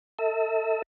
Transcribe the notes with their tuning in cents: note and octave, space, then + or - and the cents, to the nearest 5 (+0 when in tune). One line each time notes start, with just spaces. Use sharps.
A4 +30 E5 -35